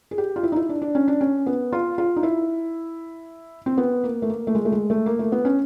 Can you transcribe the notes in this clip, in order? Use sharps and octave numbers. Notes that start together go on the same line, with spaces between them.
G#4
G4
F4
E4
D#4
E4
D4
D4
C#4
D4
C#4
B3
F4
F4
D#4
E4
C4
B3
A#3
A3
A#3
A3
G#3
A3
G#3
A3
A#3
A3
B3
C#4